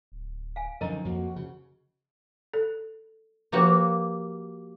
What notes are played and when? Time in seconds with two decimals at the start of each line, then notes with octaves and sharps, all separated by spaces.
0.12 D1
0.56 F5 G#5
0.81 F#2 D3 D#3 F3 A#4 D#5 A#5
1.05 F2 A#3 F#4
1.36 C#3
2.54 A4
3.52 F3 A#3 F#4 G4 B4